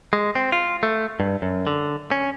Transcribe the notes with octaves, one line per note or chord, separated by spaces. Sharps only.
G#3
C4
F4
A3
G2
F#2
D3
C#4